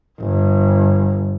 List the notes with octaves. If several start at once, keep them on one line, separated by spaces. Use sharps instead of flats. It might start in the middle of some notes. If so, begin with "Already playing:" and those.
G1